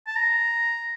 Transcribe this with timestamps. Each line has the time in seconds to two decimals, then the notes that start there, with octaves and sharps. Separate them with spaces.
0.07 A5
0.16 A#5